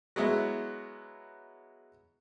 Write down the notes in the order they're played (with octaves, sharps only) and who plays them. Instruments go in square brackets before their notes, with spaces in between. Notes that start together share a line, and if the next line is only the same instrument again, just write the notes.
[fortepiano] F#3 G#3 B3 E4